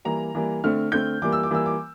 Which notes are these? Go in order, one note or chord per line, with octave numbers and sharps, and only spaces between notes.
E3 G3 A#3 A#5
E3 G3 A#3
D3 A3 C4 F6
D3 A3 C4 G6
E3 G3 A#3 D6
E6
D6
E3 G3 A#3 E6
D6